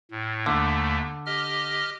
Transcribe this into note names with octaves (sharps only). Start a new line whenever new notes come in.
A2
D#2 D3 A3
G4 D#5 F6